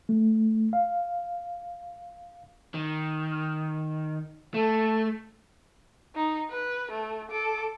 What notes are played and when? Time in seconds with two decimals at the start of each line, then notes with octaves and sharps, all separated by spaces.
0.09 A3
0.73 F5
2.74 D#3
4.54 A3 A4
6.15 D#4
6.50 B4
6.91 A3
7.31 A4 D6